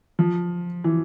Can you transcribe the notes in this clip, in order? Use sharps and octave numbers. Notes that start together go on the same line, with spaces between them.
F3
E3